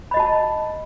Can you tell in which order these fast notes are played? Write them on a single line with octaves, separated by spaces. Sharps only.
B5 D#5 F#4 A5